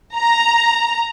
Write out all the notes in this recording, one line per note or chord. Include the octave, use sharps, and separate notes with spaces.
A#5